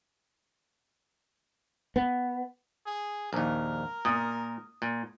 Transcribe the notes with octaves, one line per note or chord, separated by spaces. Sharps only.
B3
G#4
A#1 D#2 A#4
A#2 D#6
A#2